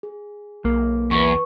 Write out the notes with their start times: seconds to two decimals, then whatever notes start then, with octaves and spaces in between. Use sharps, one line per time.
0.03 G#4
0.65 B1 A#3
1.11 E2 B4 C#6